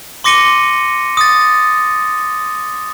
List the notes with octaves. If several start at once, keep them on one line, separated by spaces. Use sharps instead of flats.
C6 D6 A#6 C#7 D#7 G7
D#6 A6